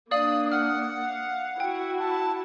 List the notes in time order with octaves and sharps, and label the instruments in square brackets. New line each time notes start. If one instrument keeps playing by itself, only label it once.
[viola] A#3 D4 [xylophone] D5 F5 F#7 [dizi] D#6
[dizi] F#5 [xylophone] F6
[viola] F5
[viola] E4 F#4 [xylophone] G5
[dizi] A5